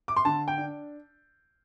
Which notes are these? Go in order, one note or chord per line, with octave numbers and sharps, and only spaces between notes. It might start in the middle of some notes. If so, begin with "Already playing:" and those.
D6
C6
D3 A5
G5
D4